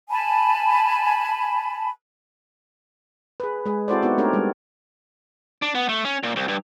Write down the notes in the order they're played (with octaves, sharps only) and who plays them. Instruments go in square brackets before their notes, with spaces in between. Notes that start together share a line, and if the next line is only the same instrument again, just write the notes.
[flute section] G#5 A5 B5
[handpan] G#4 B4
G#3 G#4
C4 E4 F#4 A4 C5 D5
B3 D#4 E4 F#4
A3 C4 D4 G4 A#4 C#5
G3 G#3
[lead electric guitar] D4
B3
A3
C#4
A#2
C2
G2